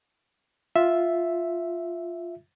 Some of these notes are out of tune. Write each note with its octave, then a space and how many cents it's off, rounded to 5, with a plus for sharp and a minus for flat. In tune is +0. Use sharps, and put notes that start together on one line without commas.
F4 +0 E5 +0